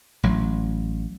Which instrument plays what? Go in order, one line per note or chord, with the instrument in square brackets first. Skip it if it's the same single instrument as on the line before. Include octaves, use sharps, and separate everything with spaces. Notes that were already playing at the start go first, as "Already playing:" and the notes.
[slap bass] A1 F#3